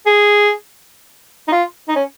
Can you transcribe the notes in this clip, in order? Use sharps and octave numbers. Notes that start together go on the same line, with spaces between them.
G#4
D#4
F4
D#4
C#4